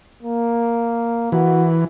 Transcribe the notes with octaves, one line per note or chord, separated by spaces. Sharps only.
A#3
E3 F#4